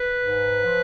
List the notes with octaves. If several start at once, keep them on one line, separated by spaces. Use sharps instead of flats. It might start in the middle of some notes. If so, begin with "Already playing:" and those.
Already playing: B4
G#2
F3